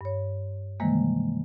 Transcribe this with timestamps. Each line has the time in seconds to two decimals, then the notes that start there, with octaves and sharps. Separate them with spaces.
0.01 G2 C#5
0.80 C3 D#3 E3 G3 G#3 A#3